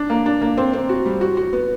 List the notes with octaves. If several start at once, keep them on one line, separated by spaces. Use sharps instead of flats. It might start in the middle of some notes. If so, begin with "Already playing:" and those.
Already playing: D4
A#3
D4
A#3
C4
C4
F#4
G3
F#4
F#4
B3